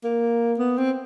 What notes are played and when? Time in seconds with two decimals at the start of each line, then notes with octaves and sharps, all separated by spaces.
0.04 A#3
0.58 B3
0.78 C4